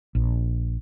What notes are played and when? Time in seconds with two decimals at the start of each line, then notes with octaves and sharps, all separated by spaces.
0.15 A#1